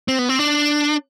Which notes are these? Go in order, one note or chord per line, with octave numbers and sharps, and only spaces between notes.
C4
B3
C4
D4